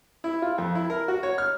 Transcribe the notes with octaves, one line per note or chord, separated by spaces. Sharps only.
E4
F4
F2
E4
A#4
F#4
C#5
F6